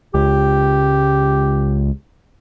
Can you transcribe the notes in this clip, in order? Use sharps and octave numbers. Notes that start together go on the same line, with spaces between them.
C#2 G4